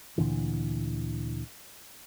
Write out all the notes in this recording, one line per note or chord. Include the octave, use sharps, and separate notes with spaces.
D2 A#2 D3 E3